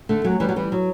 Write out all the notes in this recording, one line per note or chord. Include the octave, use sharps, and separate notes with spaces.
D3 A3
F#2 F#3
E3 G3
F#3
E3 G3
F#3